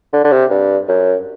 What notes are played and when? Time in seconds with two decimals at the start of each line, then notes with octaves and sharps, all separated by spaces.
0.13 D3
0.24 D3
0.32 C3
0.50 G2
0.88 F#2